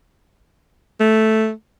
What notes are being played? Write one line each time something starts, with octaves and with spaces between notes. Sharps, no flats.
A3